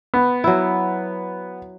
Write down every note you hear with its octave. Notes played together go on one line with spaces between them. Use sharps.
B3
F#3 E4